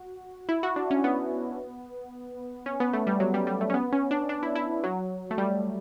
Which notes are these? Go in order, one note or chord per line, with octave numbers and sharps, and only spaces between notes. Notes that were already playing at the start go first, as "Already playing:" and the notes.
Already playing: F#4
E4
F#4
D4
C#4
B3
C#4
B3
A3
G3
F#3
G3
G3
A3
C#4
B3
C#4
D4
D4
E4
E4
F#3
A3
G3